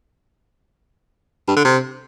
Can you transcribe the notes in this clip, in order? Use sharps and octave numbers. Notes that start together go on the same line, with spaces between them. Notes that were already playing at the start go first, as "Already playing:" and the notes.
G2
D3
C3